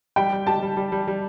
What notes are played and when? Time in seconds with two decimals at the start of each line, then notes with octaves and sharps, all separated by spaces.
0.16 G3 G5
0.32 G3
0.47 G4 A5
0.63 G3
0.77 G3
0.92 G3
1.08 G3